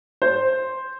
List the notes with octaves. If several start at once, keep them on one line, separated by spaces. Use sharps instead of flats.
C5